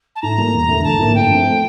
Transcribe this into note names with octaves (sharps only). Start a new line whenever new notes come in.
A5
A2 A#5
G3 A#3 F4 A#4
E1
E2 D3 A3
A#1 A5
A2 F3 A#3
G2 G5
F3 A3 C4